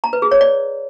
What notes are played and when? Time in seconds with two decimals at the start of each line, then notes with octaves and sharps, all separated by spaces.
0.04 A#5
0.13 B4
0.22 G#4
0.31 C#5
0.41 D5